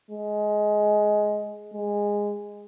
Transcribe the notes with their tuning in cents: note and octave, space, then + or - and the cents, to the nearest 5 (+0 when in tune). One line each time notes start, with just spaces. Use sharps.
G#3 +15
G#3 -15